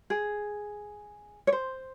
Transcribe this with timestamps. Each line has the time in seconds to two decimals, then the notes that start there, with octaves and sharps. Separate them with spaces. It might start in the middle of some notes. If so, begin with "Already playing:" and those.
0.10 G#4
1.47 C#5
1.52 C5